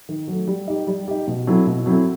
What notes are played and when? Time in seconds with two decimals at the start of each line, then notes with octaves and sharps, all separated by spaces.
0.09 D#3
0.28 F#3 A3
0.48 G3
0.67 D#4 G4
0.87 G3
1.08 D#4 G4
1.27 B2
1.47 F#3 C4 E4 A4
1.66 B2
1.86 F#3 C4 E4 A4